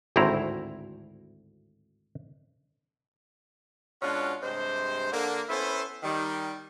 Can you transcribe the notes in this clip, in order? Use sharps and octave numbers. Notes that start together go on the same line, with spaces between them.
G#1 D2 A2 C4 E4 A#5
B2 G#3 C#4 D4 F4 F#4
G2 C3 G#3 C5
D3 A#3
B3 C#4 E4 A4 B4 C5
D#3 G3